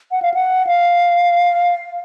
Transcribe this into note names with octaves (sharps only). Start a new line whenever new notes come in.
F#5
F5
F#5
F5